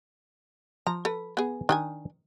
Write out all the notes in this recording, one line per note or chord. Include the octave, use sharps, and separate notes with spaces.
F3 A#5
A4 B4
B3 G#4
D#3 D4 D#5 G#5